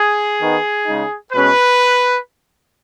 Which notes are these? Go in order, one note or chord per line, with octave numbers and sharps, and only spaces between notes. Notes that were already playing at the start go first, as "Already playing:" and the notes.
Already playing: G#4
D#3 B3 D#4
C#3 G#3 D#4
B2 G#3 C#4 B4